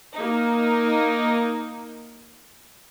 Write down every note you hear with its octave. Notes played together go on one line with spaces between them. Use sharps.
A#3 D#4